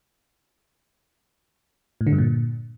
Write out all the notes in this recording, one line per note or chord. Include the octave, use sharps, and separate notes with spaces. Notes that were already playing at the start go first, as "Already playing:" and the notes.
A2
D3
G2
A#2